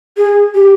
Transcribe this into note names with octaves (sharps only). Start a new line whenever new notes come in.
G#4
G4